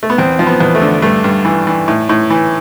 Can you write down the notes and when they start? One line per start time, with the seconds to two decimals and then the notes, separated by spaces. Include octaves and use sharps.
0.03 A3
0.10 B3
0.18 E2 C4
0.39 F3
0.47 B3
0.60 E2
0.75 A3
0.82 D3
1.02 G2 A3
1.24 G2
1.45 E3
1.67 E3
1.88 A2
2.09 A2
2.30 E3